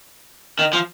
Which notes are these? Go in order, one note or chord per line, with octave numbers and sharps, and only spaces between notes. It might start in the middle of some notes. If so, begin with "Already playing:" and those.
D#3
F3